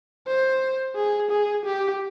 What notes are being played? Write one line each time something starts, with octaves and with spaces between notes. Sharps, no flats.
C5
G#4
G#4
G4